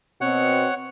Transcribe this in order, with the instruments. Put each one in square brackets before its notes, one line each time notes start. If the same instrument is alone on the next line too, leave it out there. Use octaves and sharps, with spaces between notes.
[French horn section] B2 C4 [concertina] C#5 F#5